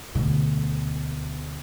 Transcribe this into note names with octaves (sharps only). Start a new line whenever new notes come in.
D2 B2